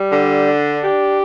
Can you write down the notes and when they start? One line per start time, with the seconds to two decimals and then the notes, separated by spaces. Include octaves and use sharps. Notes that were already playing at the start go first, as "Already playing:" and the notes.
Already playing: G3
0.10 D3
0.46 D4
0.82 G4